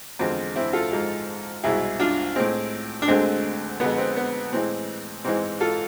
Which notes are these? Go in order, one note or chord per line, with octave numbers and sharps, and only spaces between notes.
E2 D3 F3 G#3 C4
C4 E4
F4 A4
G#2 F3 G#3
C2 B2 G#3 E4 G#4
D4 F4
A2 G#3 C4
D4
D2 D3 G#3 C4
F2 D3 G#3 B3
C4
B3
A2 E3 G#3 C4
G#2 E3 G#3 C4
F4 A4